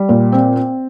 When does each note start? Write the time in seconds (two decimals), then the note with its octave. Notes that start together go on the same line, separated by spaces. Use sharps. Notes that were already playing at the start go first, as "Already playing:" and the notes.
Already playing: G3
0.09 A#2
0.32 C4
0.56 C4